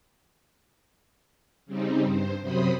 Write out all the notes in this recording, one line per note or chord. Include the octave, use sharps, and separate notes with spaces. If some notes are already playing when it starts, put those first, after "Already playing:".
C#3 G3 C4 D#4
G2 C5
F#2 C3 F#3 C5 B5 D#6